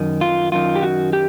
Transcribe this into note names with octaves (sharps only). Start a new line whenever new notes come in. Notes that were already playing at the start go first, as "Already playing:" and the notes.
Already playing: F#2 D#3
F4
F#2 D#3 F4
G4
F#4
G4